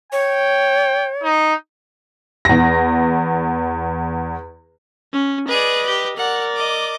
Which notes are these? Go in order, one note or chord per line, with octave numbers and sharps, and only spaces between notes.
C#5 G5
D#4
E2 A#6
C#4
G#4 B4 D5 D#5
G4
A#4 D5 F#5
D#5 D6